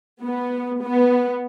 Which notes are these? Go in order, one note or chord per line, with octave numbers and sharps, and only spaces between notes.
B3
B3